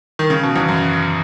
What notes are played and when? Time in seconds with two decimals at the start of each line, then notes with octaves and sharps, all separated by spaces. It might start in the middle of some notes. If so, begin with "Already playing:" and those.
0.19 D#3
0.30 C#3
0.43 B2
0.56 E2
0.68 F#2